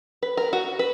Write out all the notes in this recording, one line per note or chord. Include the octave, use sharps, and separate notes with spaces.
B4
A#4
F#4
B4